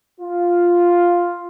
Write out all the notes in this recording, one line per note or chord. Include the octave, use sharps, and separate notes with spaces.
F4